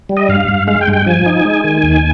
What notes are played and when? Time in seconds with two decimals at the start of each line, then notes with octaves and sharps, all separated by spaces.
0.09 G3
0.17 D#5
0.29 G2 F5
0.49 G2
0.67 G#3 F5
0.81 G5
0.88 G2
0.93 G5
1.06 F3 G#5
1.26 D#4
1.45 G#3
1.64 D#3
1.83 D#2